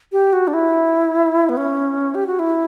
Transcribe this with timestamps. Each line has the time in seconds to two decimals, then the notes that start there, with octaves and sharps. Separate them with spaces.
0.12 G4
0.33 F#4
0.47 D4
0.54 E4
1.49 B3
1.57 C#4
2.15 G4
2.27 F#4
2.39 E4